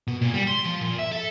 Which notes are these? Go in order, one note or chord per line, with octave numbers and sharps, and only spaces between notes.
B2
A#2
G3
C6
F3
A#2
E5
A4